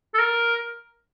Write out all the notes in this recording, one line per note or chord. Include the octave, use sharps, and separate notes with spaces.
A4
A#4